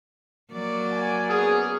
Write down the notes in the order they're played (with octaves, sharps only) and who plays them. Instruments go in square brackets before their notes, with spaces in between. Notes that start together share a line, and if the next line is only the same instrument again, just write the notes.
[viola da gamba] F#3 A#3 D5
[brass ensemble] A#4 F#5 G#5
[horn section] B3 C#4 G#4